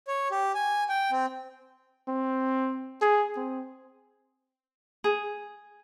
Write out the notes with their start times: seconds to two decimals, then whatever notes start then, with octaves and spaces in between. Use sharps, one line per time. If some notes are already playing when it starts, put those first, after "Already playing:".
0.08 C#5
0.31 G4
0.54 G#5
0.89 G5
1.11 C4
2.08 C4
3.02 G#4
3.37 C4
5.04 G#4